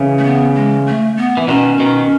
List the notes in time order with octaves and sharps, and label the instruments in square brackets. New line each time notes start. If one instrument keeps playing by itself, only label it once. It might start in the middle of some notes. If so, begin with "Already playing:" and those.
Already playing: [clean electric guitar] C#3 E3
[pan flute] A3
B3
G#3
A3
B3
[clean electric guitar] E3
[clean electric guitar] B2 D#3 [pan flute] C#4
[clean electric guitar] B2 D#3